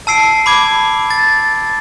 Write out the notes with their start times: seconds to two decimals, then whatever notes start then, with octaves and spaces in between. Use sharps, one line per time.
0.07 A5 E6 C7 D7
0.46 B5 D6 G#6
1.11 A6